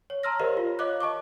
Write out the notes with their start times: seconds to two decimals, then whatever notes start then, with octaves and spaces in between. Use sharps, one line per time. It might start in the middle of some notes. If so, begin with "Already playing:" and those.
0.10 C#5
0.23 A5 A#5 C6 E6 F6 A#6
0.39 G4 A#4 C5 C#5 D#5 F5
0.57 F4
0.79 C#5 D#5 F5 D6 F#6
1.01 D#5 A5 C#6 D6